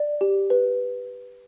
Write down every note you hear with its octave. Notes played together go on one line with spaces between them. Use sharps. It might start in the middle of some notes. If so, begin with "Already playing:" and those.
Already playing: D5
G4
B4